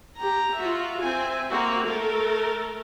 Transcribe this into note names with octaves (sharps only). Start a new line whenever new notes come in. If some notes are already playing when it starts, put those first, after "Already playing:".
G4 A#5
F4 F#4 E5
C4 G#5
A#3 C4 F#4
A3 A4 A#4